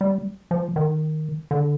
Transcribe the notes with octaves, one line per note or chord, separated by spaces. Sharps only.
G3
F3
D#3
D3